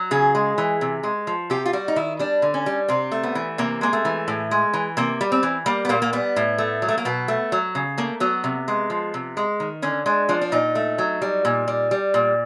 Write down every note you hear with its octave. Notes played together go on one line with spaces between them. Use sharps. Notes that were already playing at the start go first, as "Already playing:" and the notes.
Already playing: F#3
C#3 G#4
G#3
E3
C3
G#3
F3
C3 G4
F4
G3 F#4
D#4
D#3 E4
G3 D4
D3
C#4
G3
C3 C4
A3
B3
E3
C3 A#3
G#3 A#3
A3
E3
A2
G#3
E3
C3 A#3
G3
C4
E3
G3 A#3
B3
A#2 A#3
A#3
G3 B3
A2
A3
F#3
A3
A#3
B2 B3
A3
F#3
C#3
A3 A#3
F#3 B3
C3
G#3
F3
C3
G#3
D#3
D3 C#4
G#3 D4
F3 D4
D4
A#2 D#4
A3
F#3
G3
A#2
G3
G3
A#2